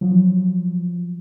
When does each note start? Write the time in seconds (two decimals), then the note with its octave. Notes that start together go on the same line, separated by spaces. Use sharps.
0.01 F3 F#3